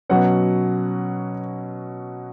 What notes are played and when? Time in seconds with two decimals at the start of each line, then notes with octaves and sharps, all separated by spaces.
0.09 B2 F#3 C#4 F#5